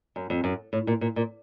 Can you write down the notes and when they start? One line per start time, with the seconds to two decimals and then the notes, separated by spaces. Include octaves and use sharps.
0.16 F#2
0.30 F2
0.44 F#2
0.73 A2
0.87 A#2
1.01 A#2
1.16 A#2